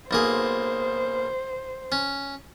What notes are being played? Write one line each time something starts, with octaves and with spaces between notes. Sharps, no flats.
B1 A#3 G#4 C5
C#4